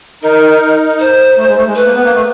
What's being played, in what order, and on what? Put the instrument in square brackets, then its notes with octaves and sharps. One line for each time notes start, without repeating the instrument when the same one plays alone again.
[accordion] D#4 [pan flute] A#4
[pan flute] C5
[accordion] A3
G#3
A3
G#3
[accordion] A3 [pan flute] B4
[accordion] A#3
B3
A#3
A3